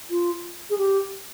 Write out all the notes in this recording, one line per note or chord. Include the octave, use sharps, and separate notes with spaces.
F4
G#4
G4